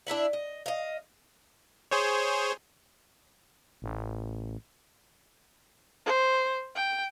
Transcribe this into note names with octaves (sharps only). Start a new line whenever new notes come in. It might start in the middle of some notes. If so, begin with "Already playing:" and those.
D4 E4 E5 F#5
D#5
D#5 F5
G#4 C5 C#5
A1
C5
G5